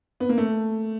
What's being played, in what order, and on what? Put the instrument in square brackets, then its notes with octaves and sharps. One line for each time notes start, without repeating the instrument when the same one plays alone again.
[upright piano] B3
A#3
A3